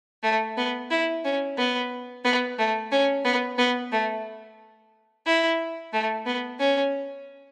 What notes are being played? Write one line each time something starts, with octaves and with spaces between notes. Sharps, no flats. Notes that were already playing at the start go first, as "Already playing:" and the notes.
A3
B3
E4
C#4
B3
B3
A3
C#4
B3
B3
A3
E4
A3
B3
C#4